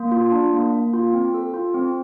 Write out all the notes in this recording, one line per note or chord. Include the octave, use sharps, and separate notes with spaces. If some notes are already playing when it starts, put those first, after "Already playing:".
Already playing: A#3
F4
D4
A#3
A#3
F4
C4
A4
F4
C4